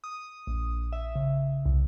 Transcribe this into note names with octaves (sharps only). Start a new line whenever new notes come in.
D#6
A#1
E5
C#3
C2